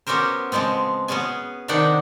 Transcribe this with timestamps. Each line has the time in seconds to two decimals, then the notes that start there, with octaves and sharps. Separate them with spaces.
0.07 B3 C#4 F#4 G4 A#4 C5
0.52 C#3 F3 G#3 B3 C4
1.08 B3 C#4 F#4 G#4 G#5
1.68 C3 D#3 D4 D#4 F#5 G5